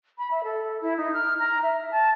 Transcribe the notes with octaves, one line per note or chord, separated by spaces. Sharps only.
B5
E5
A4
E4
D#4
F6
A#5
E5
A5